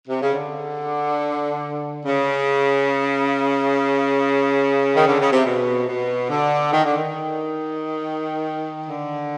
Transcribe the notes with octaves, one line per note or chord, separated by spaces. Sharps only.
C3
C#3
D3
C#3
D#3
D3
C#3
C3
B2
B2
D3
D#3
D3
D#3
D3